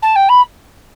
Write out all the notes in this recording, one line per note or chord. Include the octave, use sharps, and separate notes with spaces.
A5
G5
B5